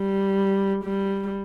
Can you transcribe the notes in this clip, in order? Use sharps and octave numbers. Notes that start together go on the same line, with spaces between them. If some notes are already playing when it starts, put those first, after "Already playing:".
Already playing: G3
G3